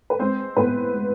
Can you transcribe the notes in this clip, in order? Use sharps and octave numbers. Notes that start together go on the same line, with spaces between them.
B4
G#3 C4 C5
A2 B3 B4
G#3